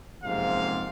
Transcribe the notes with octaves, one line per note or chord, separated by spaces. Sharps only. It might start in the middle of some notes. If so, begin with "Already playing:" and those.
F#1 F2 G#2 C3 F5